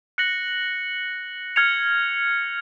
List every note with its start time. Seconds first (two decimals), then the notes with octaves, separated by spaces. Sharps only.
0.18 F#6 A#6 C#7 F#7
1.56 F6 G#6 C#7 F7